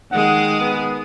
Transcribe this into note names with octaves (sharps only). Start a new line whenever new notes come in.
D#3 G#3 G#4 F#5
B3